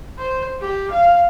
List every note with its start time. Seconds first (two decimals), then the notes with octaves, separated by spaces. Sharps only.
0.18 C5
0.61 G4
0.91 F5